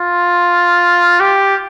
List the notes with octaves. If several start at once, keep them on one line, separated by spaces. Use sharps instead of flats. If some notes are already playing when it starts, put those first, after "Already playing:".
Already playing: F4
G4